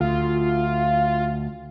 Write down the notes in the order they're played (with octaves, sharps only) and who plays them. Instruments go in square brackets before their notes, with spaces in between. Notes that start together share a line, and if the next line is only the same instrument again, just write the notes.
[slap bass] D2 [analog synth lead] F4